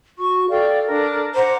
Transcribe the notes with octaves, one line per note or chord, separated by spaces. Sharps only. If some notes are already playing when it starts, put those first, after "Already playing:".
F#4 C#6
A4 D5 F5 G5
D4 A#4
C5 F#5 A#5 D6